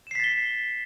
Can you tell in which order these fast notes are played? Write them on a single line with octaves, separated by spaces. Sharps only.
E7 C7 B6 A6 G7